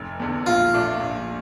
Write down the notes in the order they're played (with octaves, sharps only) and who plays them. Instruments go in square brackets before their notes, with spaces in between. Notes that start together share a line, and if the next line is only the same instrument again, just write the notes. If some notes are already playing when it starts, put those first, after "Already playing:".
Already playing: [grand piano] F1
E2 D3
[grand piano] A#1 [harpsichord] F4
[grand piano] A#2 A3 D4
A#1